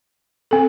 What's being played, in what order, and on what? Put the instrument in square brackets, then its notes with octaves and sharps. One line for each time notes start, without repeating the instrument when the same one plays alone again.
[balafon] C4 A4